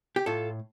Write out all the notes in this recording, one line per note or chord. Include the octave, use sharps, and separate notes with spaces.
G4
A2 F4 A4